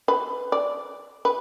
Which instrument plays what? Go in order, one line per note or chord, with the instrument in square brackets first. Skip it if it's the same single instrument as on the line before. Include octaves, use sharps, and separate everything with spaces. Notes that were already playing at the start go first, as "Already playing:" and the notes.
[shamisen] B4
D5
B4